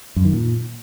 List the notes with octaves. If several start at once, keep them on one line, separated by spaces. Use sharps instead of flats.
F#2
D#3
A#2